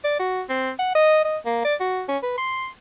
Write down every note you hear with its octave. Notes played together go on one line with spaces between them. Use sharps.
D5
F#4
C4
F#5
D#5
D#5
A#3
D5
F#4
C#4
B4
C6